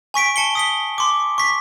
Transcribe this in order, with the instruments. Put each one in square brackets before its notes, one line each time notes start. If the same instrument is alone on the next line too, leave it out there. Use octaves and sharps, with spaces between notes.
[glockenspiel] G#5 C#6 B6 D7
A5 C#7 G7
D#6 B6 G7
C6 D6
C#6 B6